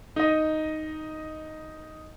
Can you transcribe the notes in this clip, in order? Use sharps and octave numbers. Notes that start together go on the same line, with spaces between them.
D#4 D#5